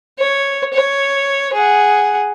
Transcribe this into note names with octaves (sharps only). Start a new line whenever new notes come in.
C#5
C#5
G#4 F#5